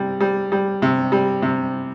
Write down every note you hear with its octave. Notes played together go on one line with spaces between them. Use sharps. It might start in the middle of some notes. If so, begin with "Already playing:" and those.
Already playing: C3 G3
G3
G3
C3
G3
C3